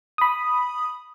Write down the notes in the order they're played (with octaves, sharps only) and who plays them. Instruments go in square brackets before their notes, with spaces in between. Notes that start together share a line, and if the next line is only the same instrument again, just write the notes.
[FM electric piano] B5 D#6